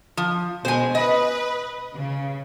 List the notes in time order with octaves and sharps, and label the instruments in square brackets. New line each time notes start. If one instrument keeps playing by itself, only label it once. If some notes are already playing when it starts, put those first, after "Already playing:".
[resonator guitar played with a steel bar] F3
[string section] B2 G#3 [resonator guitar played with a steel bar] C5 G#5
[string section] B4 [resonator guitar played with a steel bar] D#5
[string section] C#3